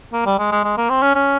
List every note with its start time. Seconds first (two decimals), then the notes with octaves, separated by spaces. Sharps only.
0.13 A#3
0.26 G3
0.39 G#3
0.51 G#3
0.64 G#3
0.77 A#3
0.90 C4
1.02 C#4
1.15 C#4